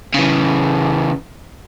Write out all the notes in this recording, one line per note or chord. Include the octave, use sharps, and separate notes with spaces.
C#3 E3